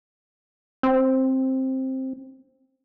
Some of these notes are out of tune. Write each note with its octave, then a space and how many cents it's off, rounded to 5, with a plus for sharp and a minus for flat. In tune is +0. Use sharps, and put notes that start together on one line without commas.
C4 +10